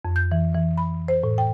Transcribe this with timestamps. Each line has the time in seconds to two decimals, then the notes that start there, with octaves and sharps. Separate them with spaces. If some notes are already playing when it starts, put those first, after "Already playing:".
0.05 F2
0.16 G6
0.32 E3
0.55 E3
0.78 B5
1.08 C5
1.23 A2
1.38 G5